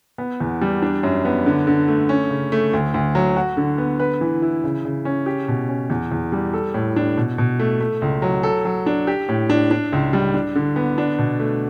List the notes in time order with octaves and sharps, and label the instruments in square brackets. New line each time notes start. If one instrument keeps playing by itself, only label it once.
[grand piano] B3
E2
G3
D4
F#2
B3
D3
D3
A3
C#4
C#3
A3
D2
D2
F#3
F#4
D3
B3
B4
E3
E4
C#3
C#3
C#4
G4
B2
C#4
E2
E2
G3
A4
A2
D4
B2
B2
A3
A3
C#2
F#3
A4
F#3
D4
G4
A2
D4
D4
C#2
G3
D4
D3
B3
D4
B2
A3